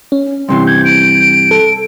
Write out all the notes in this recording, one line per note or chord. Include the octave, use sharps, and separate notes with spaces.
C#4
G2 C3 E3 C6
G6 G#6
D7
A4